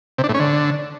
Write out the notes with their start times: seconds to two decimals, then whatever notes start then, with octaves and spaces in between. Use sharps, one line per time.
0.18 C3
0.24 D4
0.29 A2
0.34 C#4
0.40 D3